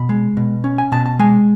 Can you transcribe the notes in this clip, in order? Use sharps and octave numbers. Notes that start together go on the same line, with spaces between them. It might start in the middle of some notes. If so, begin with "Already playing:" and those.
Already playing: B2 B5
G#3
B2
C#4
G#5
B2 A5
A5
G#3 G#5